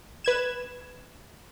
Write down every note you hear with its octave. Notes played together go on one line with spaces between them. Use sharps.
B4 G#6 E7